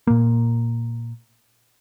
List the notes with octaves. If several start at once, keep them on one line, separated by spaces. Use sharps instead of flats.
A#2 A#3